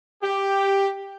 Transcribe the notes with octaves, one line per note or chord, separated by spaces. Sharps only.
G4